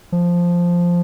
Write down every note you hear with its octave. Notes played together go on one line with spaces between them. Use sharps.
F3